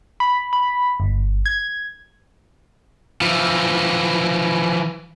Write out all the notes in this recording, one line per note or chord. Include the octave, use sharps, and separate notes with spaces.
B5
B5
G1
G#6
E3 F3